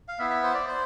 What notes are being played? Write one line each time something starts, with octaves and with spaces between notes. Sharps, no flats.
F5
B3 E4 E5
E5
C5
D5
C5